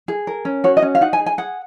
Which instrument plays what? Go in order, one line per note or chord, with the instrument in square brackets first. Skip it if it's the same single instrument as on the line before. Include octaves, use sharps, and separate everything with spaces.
[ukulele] G#4
A#4
C#4
F#4 C#5
D#5
C#4
F5
D#4 F#5
G#5
G#4
G#5
G#4 F#5